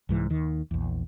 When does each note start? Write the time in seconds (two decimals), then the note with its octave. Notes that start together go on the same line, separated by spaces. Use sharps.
0.09 C2 G#2 E3
0.30 D#2 D#3
0.71 A#1 E2